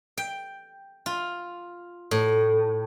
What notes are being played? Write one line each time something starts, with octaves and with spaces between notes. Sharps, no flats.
G5
F4
A2